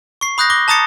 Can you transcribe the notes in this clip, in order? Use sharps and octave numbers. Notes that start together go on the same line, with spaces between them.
C#6 C7
B5 D#6 F#6 G6 A#6
D6 A#6 G7
A5 A#5 D#6 A6 C#7